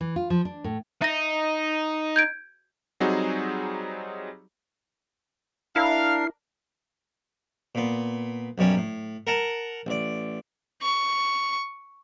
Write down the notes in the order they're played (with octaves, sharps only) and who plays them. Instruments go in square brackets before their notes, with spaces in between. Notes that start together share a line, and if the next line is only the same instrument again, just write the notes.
[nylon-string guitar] E3
F4
F3
D4
A2
[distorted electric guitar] D#4 [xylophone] E5 A#6
[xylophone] G6 G#6 D7
[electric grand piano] F#3 G3 C4 D#4 F#4 G#4
[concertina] D4 A#4 [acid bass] E4 [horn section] F5 [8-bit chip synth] F6 C7
[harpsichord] A#2 B3
B1 F#2 G3 C#4
A2
A#4 F#5 A5 A#5
A1 D5
[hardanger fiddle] C#6